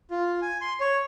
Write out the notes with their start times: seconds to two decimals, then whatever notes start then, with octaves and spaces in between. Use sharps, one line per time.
0.11 F4
0.42 G#5
0.61 C6
0.80 C#5